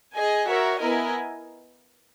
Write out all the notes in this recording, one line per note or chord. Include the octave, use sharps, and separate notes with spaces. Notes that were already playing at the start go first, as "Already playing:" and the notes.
G#4 D#5 G#5
F#4 A#4 C#5 E5
B3 E4 A#4 D#5 G#5